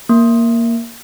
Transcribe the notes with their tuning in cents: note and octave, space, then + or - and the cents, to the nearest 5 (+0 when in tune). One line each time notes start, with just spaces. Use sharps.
A#3 +0